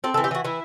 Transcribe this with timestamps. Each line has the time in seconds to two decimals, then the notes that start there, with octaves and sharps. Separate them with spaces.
0.04 C4 A4
0.14 A4
0.17 E3
0.24 G4
0.31 E3 F#4
0.44 E3 E4